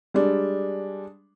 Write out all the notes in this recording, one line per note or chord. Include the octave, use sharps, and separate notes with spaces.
G3 G#3 D4